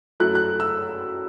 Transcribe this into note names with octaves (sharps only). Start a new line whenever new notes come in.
F#2 F#3 A3 E4 F#6
F#6
E6